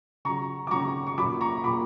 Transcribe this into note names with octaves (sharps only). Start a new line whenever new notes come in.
C#3 F#3 A#5 C#6
D6
C#3 F#3 A#5 C#6
C#6
A#2 F#3 B5 D6
A#5 C#6
A#2 F#3 B5 D6